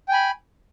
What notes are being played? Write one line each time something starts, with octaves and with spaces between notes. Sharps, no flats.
G5 G#5 B5